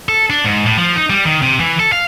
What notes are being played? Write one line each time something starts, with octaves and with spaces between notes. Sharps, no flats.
A4
D4
G#2
A2
F3
D#4
G3
D#3
C3
E3
A4
F5